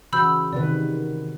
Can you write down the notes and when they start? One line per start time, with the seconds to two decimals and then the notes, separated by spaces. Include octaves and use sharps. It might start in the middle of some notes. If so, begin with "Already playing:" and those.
0.13 C#3 E3 F#4 B5 E6 G6
0.53 C3 D#3 B4 D5